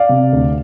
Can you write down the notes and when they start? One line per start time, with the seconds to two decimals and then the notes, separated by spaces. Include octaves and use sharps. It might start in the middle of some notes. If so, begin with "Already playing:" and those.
Already playing: D5 F5
0.09 C3
0.32 D2